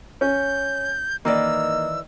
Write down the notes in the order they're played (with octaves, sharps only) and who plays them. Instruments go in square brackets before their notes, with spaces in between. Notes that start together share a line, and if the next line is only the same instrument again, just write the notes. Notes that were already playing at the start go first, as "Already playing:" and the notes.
[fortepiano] C#4 [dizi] G6
[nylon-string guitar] D#3 E3 D5 [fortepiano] A#3 [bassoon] D#4 [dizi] E6